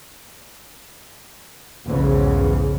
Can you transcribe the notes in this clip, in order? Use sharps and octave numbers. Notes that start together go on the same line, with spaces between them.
B1 E2 G#2 C#3 E3 F3